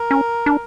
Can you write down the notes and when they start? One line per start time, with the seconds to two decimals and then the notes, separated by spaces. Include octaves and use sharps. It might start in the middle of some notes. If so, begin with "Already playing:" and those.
Already playing: A#4
0.11 C#4
0.46 D4